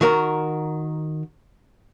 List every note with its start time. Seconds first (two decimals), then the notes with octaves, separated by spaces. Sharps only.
0.01 D#3 F#4 A#4